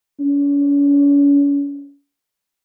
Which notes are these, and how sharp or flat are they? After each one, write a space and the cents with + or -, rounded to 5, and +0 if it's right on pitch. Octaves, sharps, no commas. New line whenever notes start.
C#4 +40